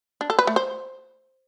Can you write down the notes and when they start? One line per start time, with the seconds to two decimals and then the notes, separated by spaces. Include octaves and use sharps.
0.21 D4
0.30 A4
0.39 B4
0.47 A3
0.56 C5